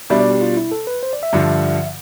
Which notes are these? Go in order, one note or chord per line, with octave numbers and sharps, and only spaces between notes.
B2 G3 D4 E5
D5
G4
F4
E4
A4
B4
C5
D5
E5
G2 D3 F3